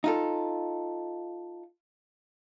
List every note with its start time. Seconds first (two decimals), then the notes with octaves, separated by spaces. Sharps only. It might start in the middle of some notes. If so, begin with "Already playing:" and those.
0.04 D#4 F4 A4